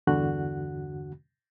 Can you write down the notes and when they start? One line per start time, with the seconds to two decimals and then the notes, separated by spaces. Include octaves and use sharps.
0.07 E2 G2 D3 F#4 F#6